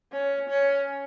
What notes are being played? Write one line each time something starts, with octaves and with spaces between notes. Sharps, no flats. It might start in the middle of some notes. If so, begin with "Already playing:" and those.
C#4
C#4